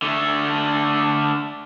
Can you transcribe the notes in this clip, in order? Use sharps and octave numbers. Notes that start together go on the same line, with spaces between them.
D3 A3